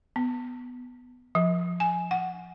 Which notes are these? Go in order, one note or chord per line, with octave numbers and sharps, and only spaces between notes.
B3
F3
G#5
F#5